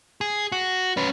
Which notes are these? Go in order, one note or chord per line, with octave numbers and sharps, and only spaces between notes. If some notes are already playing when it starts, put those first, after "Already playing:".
G#4
F#4
C#4 B4